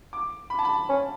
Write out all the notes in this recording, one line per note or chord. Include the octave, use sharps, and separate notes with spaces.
D6
B5
A5
B5
C#4